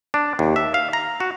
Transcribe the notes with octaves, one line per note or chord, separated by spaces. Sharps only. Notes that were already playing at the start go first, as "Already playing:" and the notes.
D4
D#2
E5
F5
A#5
F#4